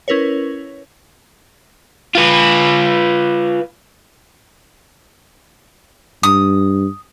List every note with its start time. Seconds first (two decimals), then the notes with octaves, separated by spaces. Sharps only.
0.08 C#4 E4 A#4 B4 C#5
2.15 F4 B4
6.23 G2 D#6